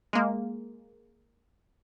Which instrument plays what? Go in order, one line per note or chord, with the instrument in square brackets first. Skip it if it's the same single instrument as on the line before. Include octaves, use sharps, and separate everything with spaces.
[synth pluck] G#3 A#3